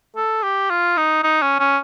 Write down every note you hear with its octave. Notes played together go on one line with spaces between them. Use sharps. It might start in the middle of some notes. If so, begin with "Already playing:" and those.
A4
G4
F4
D#4
D#4
C#4
C#4